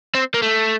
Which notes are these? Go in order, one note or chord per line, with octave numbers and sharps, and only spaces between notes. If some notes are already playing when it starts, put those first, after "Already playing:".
C4
A#3
A3